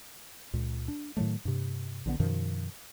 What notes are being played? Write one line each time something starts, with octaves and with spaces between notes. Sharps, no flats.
C#2 A#2
D4
A2 D#3 F#3 A3
G2 C3
A#1 D3 F3 B3
F#2 B2 D#3 F3